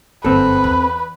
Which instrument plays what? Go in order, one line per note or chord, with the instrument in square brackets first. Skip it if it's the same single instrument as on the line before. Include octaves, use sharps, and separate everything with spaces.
[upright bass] G1 F#2 [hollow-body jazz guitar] C4 A4 [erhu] B4
[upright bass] E2